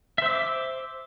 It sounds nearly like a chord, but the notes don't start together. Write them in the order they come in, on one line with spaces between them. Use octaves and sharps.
E5 C5 E6 D6